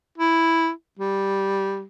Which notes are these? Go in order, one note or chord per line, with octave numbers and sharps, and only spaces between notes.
E4
G3